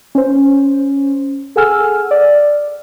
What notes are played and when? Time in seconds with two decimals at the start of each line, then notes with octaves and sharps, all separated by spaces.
0.15 C#4 C5
1.56 G#4 A4 F#5 G#5 E6 F6
2.11 D5